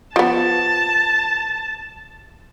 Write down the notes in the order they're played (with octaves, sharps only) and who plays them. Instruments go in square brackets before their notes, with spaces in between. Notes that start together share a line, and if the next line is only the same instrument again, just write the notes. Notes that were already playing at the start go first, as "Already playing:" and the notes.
[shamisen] F3 B3 [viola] A5